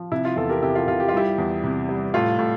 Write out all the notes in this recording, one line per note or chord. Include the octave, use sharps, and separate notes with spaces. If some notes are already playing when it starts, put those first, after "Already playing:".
Already playing: F3
C3 E4
F4
E2 F4 A4
G4 A#4
C3 E4 G4
F4
C3 F4
G4
F4
G3 E4 G4
E2
C3
G3
A2 F4
A2